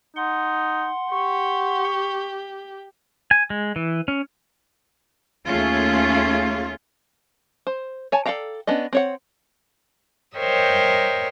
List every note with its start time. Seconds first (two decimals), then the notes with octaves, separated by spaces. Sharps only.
0.16 D#4 F#5 C6
1.12 G4 C#6
3.31 G#5
3.50 G#3
3.76 E3
4.08 C#4
5.47 D#2 A3 C#4 F4 G#4
7.67 C5
8.12 C#5 G#5 A5
8.26 A4 D5 F5 G5 A#5
8.67 B3 C#4 D4 D#5
8.93 C4 C#5 F#5
10.38 A#4 C5 C#5 D#5 E5 G5